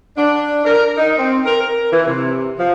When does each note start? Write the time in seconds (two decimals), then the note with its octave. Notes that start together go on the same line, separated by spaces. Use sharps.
0.17 D4
0.65 A#4
0.97 D#4
1.18 C4
1.45 A#4
1.61 A#4
1.91 E3
2.06 C3
2.58 F3